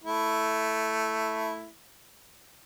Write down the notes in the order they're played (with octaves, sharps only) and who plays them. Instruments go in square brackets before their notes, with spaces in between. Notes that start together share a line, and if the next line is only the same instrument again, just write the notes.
[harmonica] A3 E4